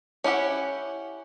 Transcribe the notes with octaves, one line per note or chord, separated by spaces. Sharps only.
C#4 E4 G4 F#5